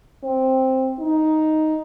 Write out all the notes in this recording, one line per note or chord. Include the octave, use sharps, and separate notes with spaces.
C4
D#4